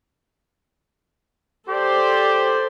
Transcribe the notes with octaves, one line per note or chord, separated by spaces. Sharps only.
G4 A4 C5 D5